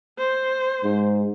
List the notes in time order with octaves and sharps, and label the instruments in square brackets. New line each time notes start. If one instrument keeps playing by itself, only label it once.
[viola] C5
[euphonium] G#2